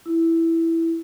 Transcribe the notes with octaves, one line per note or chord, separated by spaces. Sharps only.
E4